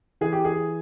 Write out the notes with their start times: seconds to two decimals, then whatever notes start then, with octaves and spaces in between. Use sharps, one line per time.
0.21 E3 G#4
0.32 G4
0.45 G#4